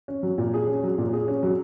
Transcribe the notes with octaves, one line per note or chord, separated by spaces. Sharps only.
C#4
F#3
A#2
G#4
C#4
F#3
A#2
G#4
C#4
F#3